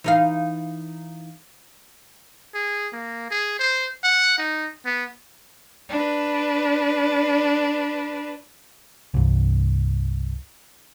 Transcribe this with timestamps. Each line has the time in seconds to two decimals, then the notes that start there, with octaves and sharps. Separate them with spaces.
0.04 E3 D#4 F5
2.55 G#4
2.93 A#3
3.30 G#4
3.59 C5
4.04 F#5
4.38 D#4
4.85 B3
5.89 D4 B4
9.14 C2 G2